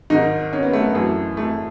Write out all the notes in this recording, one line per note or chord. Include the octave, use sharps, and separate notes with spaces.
G#2 D#3 D#4
C#4
B3
A3
B3
F#2 E3 A3
A3